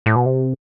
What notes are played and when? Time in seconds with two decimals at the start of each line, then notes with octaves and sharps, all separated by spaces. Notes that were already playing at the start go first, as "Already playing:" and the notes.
0.06 A2
0.16 B2
0.26 C3